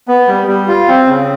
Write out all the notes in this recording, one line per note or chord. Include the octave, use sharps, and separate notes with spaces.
B3
G3
G3
F4
C4
C#3